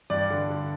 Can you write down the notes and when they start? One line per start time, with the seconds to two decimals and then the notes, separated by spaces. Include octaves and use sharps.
0.10 G2 D5
0.30 D3
0.50 D3